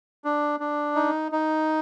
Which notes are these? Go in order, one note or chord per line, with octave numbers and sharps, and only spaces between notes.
D4
D4
D#4
D#4